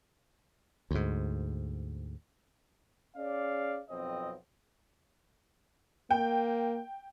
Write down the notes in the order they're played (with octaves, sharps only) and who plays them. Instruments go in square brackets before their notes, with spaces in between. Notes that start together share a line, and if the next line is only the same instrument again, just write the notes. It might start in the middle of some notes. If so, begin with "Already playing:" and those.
[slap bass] D2 G#2
[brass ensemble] C#4 G#4 D5 F5
B1 F2 C4 D#5
[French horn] A#3 [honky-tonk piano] G5